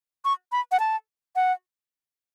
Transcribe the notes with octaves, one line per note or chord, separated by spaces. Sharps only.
C#6
B5
F#5
A5
F#5